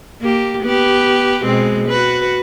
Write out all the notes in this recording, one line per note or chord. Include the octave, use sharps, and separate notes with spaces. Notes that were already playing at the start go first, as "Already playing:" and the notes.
A#3 G4
B3 G4 B4
B2 G#3 C4
F#4 B4